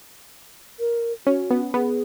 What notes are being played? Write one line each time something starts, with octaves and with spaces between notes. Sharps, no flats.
A#4
C#4 F#4
B3
B3 G#4